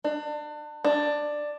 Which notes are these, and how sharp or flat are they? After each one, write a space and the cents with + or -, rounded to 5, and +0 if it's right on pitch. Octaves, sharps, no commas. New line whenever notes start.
D4 +30
D4 +10